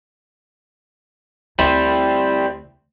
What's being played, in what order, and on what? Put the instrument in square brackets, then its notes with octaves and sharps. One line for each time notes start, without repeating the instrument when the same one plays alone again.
[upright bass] D2 [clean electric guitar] G3 C4 E4